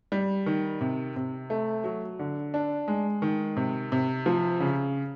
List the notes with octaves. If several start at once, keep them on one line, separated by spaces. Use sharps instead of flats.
G3
D#3
C3
C3
A3
F#3
D3
D4
G#3
D#3
C3
C3
F3
C#3